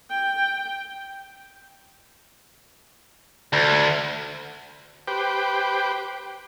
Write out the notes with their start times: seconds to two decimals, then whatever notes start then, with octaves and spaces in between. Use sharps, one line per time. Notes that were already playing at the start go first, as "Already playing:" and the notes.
0.10 G5
3.53 D2
5.08 G4 B4 C5 G5